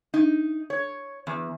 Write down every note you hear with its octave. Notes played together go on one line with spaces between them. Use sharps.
D#4
C#5
E2